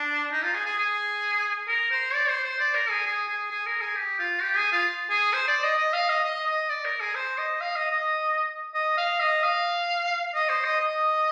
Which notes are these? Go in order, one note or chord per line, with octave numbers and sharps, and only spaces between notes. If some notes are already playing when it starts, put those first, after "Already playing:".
Already playing: D4
D#4
F4
G#4
G#4
G#4
A#4
C5
D5
C5
C5
D5
A#4
G#4
G#4
G#4
G#4
A#4
G#4
G4
F4
G4
G#4
F4
G#4
C5
D5
D#5
D#5
F5
D#5
D#5
D#5
D5
A#4
G#4
C5
D#5
F5
D#5
D#5
D#5
F5
D#5
F5
D#5
C5
D#5
D#5